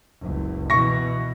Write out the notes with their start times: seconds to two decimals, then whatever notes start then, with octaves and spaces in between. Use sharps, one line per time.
0.21 F#1 C#2
0.70 B2 E3 C#6 A#6